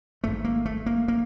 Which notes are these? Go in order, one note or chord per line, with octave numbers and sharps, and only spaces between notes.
G#1 G#2 A3
A#3
A3
A#3
A#3